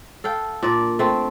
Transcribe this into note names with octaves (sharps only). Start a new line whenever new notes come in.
A4 F5 G5
A#2 D4 D5
A3 C4